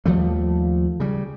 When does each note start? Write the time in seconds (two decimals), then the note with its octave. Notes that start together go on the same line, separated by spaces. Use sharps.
0.06 D#2 F3 G3 A3
1.00 C#3 G3